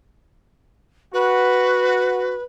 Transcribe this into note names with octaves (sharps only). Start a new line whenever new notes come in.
F#4 B4